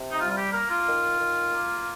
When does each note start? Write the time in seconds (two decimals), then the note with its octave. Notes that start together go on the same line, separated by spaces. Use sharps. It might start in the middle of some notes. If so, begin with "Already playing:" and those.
Already playing: C3
0.12 D#4
0.20 G3 F4
0.31 F4
0.37 G4
0.53 A#3 A#4
0.70 F4
0.86 D#3
1.19 D#3
1.52 A#3